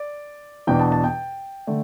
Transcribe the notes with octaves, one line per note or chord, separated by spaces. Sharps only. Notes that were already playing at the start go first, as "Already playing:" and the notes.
Already playing: D5
E2 B2 B3 D4 G5
A5
A5
G5
D3 A3